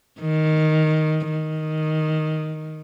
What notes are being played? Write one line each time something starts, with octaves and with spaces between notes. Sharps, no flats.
D#3
D#3